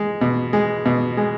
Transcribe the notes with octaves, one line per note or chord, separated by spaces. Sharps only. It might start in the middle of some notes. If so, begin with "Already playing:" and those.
Already playing: G#3
B2
G#3
B2
G#3